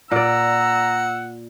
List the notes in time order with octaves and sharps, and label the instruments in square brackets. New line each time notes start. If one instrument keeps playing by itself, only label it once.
[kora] A#2 D5 [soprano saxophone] F#5 [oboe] A#5 [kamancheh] E6